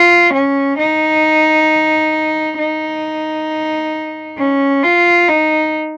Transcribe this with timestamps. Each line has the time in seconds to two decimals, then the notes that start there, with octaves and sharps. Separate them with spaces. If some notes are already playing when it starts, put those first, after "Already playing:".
Already playing: F4
0.33 C#4
0.78 D#4
2.58 D#4
4.38 C#4
4.83 F4
5.28 D#4